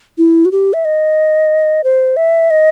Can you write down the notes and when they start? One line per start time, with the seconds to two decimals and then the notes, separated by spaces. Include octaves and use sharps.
0.18 E4
0.45 F#4
0.52 G4
0.73 E5
0.85 D#5
1.84 C5
2.17 E5
2.50 D#5